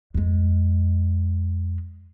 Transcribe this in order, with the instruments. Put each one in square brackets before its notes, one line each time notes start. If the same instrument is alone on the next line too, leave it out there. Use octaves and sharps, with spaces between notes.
[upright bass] F2 G#3